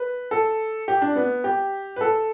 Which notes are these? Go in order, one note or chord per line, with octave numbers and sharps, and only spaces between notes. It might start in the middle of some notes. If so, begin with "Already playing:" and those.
Already playing: B4
A4
G4
D4
B3
G4
B4
A4